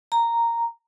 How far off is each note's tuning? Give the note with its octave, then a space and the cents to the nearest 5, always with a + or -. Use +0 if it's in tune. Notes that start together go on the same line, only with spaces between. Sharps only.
A#5 -5